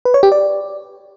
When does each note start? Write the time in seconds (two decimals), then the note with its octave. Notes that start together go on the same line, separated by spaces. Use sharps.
0.05 B4
0.14 C#5
0.23 G4
0.32 D5